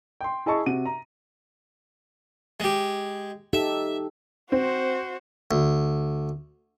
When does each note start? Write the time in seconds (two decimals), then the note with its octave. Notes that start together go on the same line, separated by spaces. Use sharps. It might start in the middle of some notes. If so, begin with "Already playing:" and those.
0.21 G5 C6
0.46 E4 G#4 D#5 A5 C#6
0.66 C3 F#4 D#7
0.85 A#5
2.60 G#3 G4
3.53 D#4 G4 A4 E5
4.52 C4 F#4 C5
5.51 D2